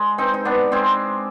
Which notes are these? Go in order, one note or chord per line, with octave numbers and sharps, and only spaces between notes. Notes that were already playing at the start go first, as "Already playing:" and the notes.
Already playing: G#3
C4 D#4
D#4
B3 D4
G#3 C4